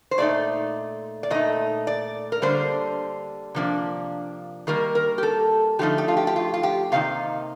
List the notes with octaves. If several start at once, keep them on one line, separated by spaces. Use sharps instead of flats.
C5
A#2 A3 D#4 D5
D5
A#2 A3 D#4 D#5
D5
A#4
D3 G3 A#3 D4 C5
C3 F3 A#3 D4
D#3 G3 A#3 A#4
A#4
G4
A4
D3 F3 A3 D#4 G4
G4
F4
G4
G4
F4
F4
G4
C3 D#3 A#3 D#4 F5